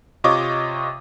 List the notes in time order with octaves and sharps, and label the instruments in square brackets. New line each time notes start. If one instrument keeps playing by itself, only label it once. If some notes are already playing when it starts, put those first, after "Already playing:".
[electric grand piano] C3 F4 C#5 D#5 C#6 D6